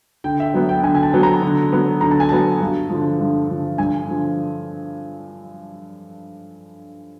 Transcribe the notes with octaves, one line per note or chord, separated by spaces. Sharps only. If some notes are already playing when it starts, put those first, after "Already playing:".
D3 G5
E5
F#3 B3
G5
D3 G#5
G#5
A5
F#3 B3
A#5
D3
F#3 B3
D3 A#5
A5
G#5
F#3 B3 A5
G2
D3 F3
G2
D3 F3
G2 G#5
D3 F3